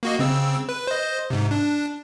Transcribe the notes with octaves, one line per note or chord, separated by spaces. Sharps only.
A#3 F#4 D#5
C#3 C4 E6
B4
C5 D#5
G#2 C3
D4